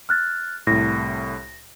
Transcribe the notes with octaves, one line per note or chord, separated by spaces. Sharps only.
F6 F#6 A6
C2 A2 A#6